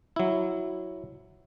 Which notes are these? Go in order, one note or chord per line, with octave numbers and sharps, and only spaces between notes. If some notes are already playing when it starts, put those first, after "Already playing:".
F#3 E4